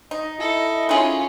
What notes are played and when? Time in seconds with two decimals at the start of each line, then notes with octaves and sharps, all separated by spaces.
0.11 D#4 D#5
0.40 E4 A4
0.89 C#4 D#4 F4 G#4